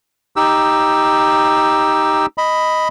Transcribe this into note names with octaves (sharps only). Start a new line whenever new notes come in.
D#4 G4 E6
D#5 B5